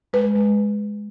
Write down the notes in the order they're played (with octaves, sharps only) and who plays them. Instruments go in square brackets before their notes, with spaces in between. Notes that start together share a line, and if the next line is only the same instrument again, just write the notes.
[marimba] G#3 B4
G#3